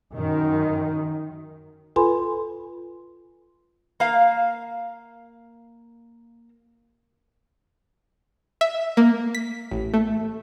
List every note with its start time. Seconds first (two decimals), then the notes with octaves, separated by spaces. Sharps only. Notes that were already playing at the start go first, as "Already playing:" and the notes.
0.13 F#2 D#3
1.96 F4 A4 B4 G#5 B5 C6
4.00 A#3 F5
8.61 E5
8.97 A#3
9.35 B6
9.71 A1
9.94 A3